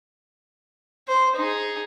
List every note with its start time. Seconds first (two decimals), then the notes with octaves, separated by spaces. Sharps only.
1.08 C5
1.36 D#4 G#4